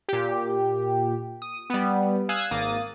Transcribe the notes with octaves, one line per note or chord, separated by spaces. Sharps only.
A#2 G4
D#6
G3 B3
F5 G#5 D#6 E6 F#6 G#6
G#1 A#3 D#6 A6